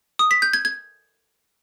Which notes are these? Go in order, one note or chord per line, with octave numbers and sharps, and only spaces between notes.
D#6
B6
G6
G#6
G#6